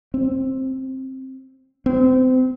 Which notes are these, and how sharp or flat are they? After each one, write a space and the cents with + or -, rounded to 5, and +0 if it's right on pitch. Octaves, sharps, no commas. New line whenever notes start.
C4 +10
C4 -30